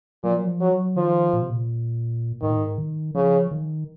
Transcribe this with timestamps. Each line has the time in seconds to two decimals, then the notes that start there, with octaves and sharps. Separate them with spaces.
0.23 A#2 F#3
0.31 F3
0.38 F#3
0.47 F3
0.61 F#3
0.72 F#3
0.96 D#3 F3
1.33 A#2
1.42 C3
1.50 A#2
2.42 G#2 D#3
2.49 A#2
2.56 G#2
2.78 D#3
3.15 C#3 F3
3.51 D#3